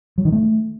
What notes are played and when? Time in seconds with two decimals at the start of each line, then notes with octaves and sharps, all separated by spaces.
0.18 F#3
0.25 D#3
0.32 A3